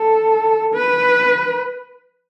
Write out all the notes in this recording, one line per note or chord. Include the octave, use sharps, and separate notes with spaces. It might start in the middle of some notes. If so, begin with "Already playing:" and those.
Already playing: A4
B4